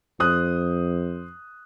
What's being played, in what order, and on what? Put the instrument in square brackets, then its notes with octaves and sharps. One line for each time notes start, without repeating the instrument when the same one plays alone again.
[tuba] F2 [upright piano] C5 D#6 F#6